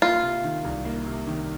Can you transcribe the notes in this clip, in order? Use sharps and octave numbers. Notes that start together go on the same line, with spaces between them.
A#3 F4
C3
D#3
C2
A#3
C3
D#3